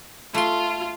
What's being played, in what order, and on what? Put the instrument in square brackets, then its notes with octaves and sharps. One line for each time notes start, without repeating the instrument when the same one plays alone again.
[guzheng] A3 C6 [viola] F4